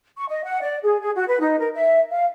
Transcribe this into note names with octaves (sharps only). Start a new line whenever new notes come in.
C#6
D#5
F#5
D5
G#4
G#4
F#4
B4
D#4
A#4
E5
F5